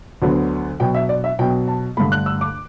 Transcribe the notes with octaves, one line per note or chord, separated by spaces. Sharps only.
D2 D3 F#3 B3
B2 F#3 B3 G5
E5
D5
E5
B2 F#3 B3 G5
A5
G2 D3 A3 B5
F#6
E6
D6